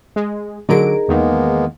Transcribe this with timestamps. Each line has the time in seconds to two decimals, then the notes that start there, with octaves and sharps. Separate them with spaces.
0.16 G#3
0.69 D3 F#3 D#4 G#4 A#4 D7
1.08 E2 D#3 G#3 A#3 B3